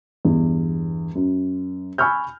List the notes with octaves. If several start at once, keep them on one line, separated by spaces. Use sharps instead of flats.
E2 G2
F#2
G#5 B5 C#6 E6 F6 G6